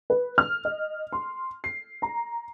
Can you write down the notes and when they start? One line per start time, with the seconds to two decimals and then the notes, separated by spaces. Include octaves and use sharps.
0.10 B4
0.38 F6
0.65 D#5
1.13 C6
1.64 C7
2.02 A#5